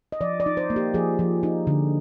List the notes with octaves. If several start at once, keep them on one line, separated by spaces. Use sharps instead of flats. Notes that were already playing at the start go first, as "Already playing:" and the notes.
D#5
F3 D5
D5
D#4
C5
A#3
G4
F3 G#4
F3
D#4
D3